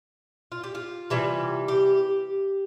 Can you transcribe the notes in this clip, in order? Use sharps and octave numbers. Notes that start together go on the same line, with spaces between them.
F4
G4
F4
C3 E3 G3
G4